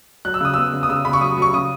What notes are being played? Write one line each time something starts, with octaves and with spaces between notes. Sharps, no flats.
F#3 F#6
E6
C#3 D#6
B3 E6
C#3
D#6
C#3 E6
C#3 B5
C#6
F#3 D#6
F#3 C#6
C#3 D#6